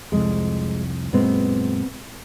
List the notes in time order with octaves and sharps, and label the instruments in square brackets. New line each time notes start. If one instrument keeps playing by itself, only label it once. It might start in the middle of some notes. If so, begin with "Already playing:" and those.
[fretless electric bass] C2 F2 [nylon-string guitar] G#3
[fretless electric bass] F#2 A#2 G#3 [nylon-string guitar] B3 C4